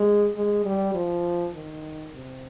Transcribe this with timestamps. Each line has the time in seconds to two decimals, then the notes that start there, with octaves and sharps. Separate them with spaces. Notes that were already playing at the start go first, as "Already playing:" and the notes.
Already playing: G#3
0.36 G#3
0.66 G3
0.95 F3
1.54 D#3
2.14 C3